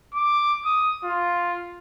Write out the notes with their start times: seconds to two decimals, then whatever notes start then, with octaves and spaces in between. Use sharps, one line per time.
0.14 D6
0.65 D#6
1.04 F4